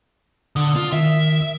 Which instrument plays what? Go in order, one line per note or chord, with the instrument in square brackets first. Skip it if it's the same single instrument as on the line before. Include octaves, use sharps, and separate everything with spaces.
[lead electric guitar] D3 [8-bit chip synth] D#6
[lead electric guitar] F4
[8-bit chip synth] D#3 [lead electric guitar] E5